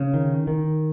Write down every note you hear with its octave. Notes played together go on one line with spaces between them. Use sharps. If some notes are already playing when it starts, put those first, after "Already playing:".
Already playing: C#3
D#3
D#3